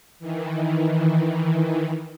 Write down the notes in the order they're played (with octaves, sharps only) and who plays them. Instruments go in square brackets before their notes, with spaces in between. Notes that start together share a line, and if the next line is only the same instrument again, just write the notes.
[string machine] D#3 E3